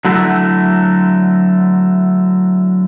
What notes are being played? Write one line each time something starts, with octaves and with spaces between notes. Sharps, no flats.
D3 F#3 A3 E4 F#4